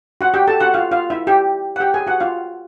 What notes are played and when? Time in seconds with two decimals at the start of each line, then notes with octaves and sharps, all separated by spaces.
0.21 F#4 F#5
0.34 G4 G5
0.48 A4 A5
0.60 F#4 F#5
0.74 F4 F5
0.91 F4 F5
1.10 E4 E5
1.27 G4 G5
1.76 F#5
1.80 G4 G5
1.94 G#4 G#5
2.07 F#4 F#5
2.20 F4 F5